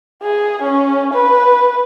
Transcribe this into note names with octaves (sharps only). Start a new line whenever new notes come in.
G#4
C#4
B4